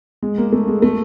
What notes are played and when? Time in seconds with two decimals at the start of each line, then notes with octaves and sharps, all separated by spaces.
0.23 G#3
0.38 A#3
0.52 A3
0.68 G#3
0.82 A3